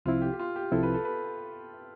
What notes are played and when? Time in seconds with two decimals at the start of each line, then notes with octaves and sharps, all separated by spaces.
0.05 C2 C3 F3 C4 E4 F4
0.22 G4
0.33 G4
0.39 F4
0.56 G4
0.72 C2 C3 F3 C4 E4 A4
0.83 B4
0.94 A4
1.05 B4